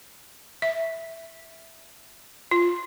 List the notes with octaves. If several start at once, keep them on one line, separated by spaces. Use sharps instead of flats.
E5
F4